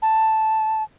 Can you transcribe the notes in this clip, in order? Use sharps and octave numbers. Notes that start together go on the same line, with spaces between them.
A5